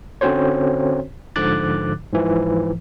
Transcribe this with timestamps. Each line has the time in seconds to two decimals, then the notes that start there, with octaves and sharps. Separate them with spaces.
0.21 D3 C4 C#4 F#4 C5 C#5
1.36 G#2 D3 F3 D6 F#6 A6
2.13 G#2 E3 F3